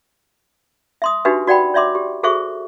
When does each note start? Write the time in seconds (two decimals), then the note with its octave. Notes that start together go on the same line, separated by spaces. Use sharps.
1.02 E5 C6 D#6
1.25 D4 D#4 F#4 G4 B4 E5
1.47 F#4 D5 F#5 G5 B5
1.74 C#5 D5 E5 C6 D6
1.95 G4
2.23 F#4 G#4 A4 C5 E5 C#6